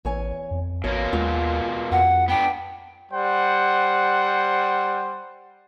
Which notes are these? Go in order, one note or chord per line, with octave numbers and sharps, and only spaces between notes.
A1 E2 C#5 G#5
F2
A1 B2 A#3 C#5
D#2 G#3 F4 F#4
F2 F#5
B3 D4 G5
G3 C5 F#5